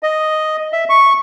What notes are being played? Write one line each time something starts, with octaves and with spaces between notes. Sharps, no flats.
D#5
E5
C#6